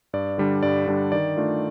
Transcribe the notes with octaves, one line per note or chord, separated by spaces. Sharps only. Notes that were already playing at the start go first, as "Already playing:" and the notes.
G2 D5
D3 G3 D4
G2 D5
D3 G3 D4
D#3 D5
A3 D4 F4